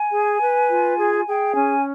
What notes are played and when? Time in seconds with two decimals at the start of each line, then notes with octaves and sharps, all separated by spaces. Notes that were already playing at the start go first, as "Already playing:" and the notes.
Already playing: G#5
0.11 G#4
0.40 B4
0.69 F4
0.98 G#4
1.25 G#4 G5
1.55 C#4 G#5